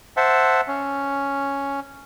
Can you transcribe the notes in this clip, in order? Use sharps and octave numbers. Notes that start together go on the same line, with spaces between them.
C5 E5 F#5 A5
C#4